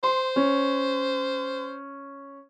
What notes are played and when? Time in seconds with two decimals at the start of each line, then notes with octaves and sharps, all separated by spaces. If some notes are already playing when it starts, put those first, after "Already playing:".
0.03 C5 C6
0.36 C#4